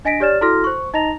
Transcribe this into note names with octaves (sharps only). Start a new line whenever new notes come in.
D4 D#5 G#5 A#6 B6 D7
G4 C#5 D5 F6 A6 E7
E4 F#4 A4 C6 F6 A#6
C5 C#6
D#4 D#5 A#5 A#6 F7